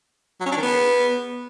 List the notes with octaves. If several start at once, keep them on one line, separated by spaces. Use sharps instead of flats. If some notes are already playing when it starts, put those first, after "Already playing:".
F#3
C#4
D4
D#3
B3